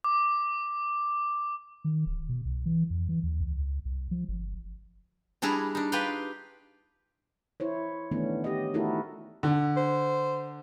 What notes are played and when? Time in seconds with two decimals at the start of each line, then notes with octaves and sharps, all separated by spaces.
0.04 D6
1.84 D#3
2.06 D1
2.29 B2
2.45 C2
2.66 E3
2.90 F2
3.09 E3
3.23 D#2
3.41 C#2
3.85 C2
4.11 F3
4.28 G1
5.42 G3 D4 E4 G#4 A#5
5.75 D4 D#4
5.92 F4 G4 B4 F5 G5
7.60 E4 C5 C#5
8.11 D#3 E3 A3 B3 C#4 D4
8.44 G4 D#5
8.74 A3 D#4 E4 F#4 A4 A#4
9.43 D3
9.77 C5